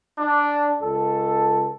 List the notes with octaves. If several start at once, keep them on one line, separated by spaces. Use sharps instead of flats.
D4
C#2 A4